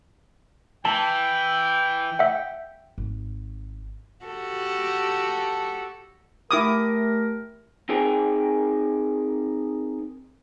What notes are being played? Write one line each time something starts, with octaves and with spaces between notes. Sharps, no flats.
E3 G5 A5
E5 F#5
G#1
F#4 G4 A4
A3 E4 G4 A#4 D6 D#6
C4 D#4 G#4 A#4 G5 G#5